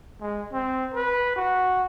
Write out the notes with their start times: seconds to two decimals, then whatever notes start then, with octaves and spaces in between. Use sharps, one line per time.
0.20 G#3
0.53 C4
0.94 B4
1.36 F#4